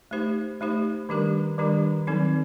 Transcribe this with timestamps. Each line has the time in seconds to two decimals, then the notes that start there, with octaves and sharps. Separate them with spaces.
0.11 A3 D#4 G4 C5
0.61 A3 D#4 G4 C5
1.09 D#3 G3 D4 G4 A#4
1.58 D#3 G3 D4 G4 A#4
2.07 D#3 F#3 C4 D#4 A4